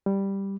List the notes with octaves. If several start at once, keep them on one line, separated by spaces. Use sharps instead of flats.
G3